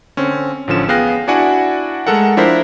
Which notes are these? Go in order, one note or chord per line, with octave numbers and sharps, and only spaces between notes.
D3 C4 C#4
A1 D3 F3 C#4 E7
B3 G#4 F5 G5 F#6 A#6
D4 E4 F#4 D5 F#5 G#5
G#3 A3 A4 A#4 F#5
F3 D4 E4 A#4 C5 B6